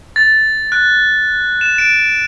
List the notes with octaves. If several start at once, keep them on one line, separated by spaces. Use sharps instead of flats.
A6
F#6
E7
D7